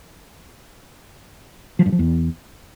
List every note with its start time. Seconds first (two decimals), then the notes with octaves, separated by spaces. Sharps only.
1.79 F3
1.86 G2
1.92 F3
1.99 E2